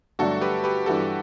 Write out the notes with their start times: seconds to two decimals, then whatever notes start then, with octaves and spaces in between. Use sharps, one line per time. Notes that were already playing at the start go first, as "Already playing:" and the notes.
0.19 G2 D3 F#3 A3 D4 F#4 A4
0.41 G4 B4
0.64 G4 B4
0.86 G2 E3 G3 F#4 A4